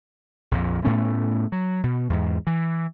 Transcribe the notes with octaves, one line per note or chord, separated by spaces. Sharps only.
A#1 F2 A#2
A2 A3 B3 C#4
F#3
B2
E2 G#2
E3